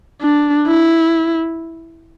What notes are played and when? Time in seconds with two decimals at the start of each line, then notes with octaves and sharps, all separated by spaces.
0.22 D4
0.68 E4